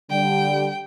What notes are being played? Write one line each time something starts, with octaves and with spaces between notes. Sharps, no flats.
D3 G3 G5